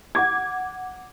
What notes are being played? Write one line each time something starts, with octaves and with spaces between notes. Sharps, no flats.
F#5 D6 G#6